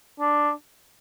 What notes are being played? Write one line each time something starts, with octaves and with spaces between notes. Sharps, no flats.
D4